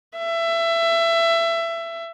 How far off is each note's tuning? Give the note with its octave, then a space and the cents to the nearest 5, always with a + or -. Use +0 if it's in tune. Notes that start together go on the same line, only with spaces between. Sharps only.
E5 +20